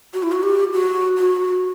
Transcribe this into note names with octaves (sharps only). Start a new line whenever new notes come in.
F#4
E4
F#4
G4
F#4
F#4